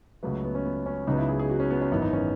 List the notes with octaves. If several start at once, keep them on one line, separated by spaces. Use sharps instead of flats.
C#2 C#3 F#3 A3 B4
B3
C#4
B3
C#4
C#2 C#3 F#3 B3 D#4
E4
G#4
G#4
F#4
C#4
B3
C#4
G#1 F#2 E3 B3 D#4
D#4
C#4